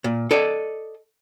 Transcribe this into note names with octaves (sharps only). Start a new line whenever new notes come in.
A#2
A4 D5 D#5